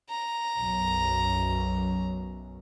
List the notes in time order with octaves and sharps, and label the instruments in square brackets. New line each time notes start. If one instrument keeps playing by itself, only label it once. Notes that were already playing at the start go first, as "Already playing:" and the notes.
[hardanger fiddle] A#5
[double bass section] B1 F#2